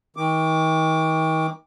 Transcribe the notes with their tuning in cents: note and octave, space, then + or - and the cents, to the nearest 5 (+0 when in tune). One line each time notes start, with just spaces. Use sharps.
D#3 +40 D6 +0